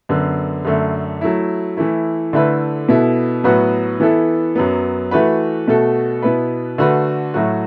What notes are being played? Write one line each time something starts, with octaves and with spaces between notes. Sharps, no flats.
F#2 D3 B3
F#2 D3 A3
F#3 A3 E4
E3 A3 E4
D3 A3 E4 B4
B2 B3 E4 A4
A2 F#3 B3 F#4 B4
E3 B3 E4 A4
F#2 F#3 B3
E3 A3 F#4 B4
B2 A3 F#4 A4
B2 B3 E4 B4
D3 A3 F#4 B4
A2 F#3 A3 F#4